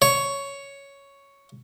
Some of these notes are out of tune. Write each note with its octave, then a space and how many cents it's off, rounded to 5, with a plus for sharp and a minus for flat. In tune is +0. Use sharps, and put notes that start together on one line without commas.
C#5 +5